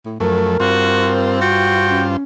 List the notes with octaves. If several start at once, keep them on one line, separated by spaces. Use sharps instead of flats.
A2
F#2 F3 A3 A#4
G2 C4 F4 F#4 C5
F#4 G5
C#4